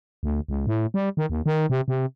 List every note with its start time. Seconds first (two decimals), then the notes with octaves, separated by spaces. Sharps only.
0.23 D2
0.48 C#2
0.67 A2
0.94 G3
1.17 D#3
1.30 D#2
1.46 D#3
1.70 C3
1.88 C3